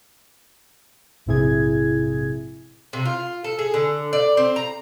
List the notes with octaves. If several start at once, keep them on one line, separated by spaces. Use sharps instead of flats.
A#1 G#2 C3 E4 G#4 G#6
C3
F4
A4
G#4
D3
D5
C4
A#5